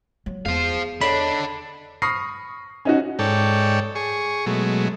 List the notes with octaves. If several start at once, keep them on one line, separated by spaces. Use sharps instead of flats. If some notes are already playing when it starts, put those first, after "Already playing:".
F#3
E2 G#4 C5 F5
D3 D4 A4 C#5 D#5 B5
B5 C#6 D#6 F6 A#6 C7
C#4 D#4 F#4
G#2 A4 C#5 D5 G5
G#4 C#6
B2 F#3 G#3 A3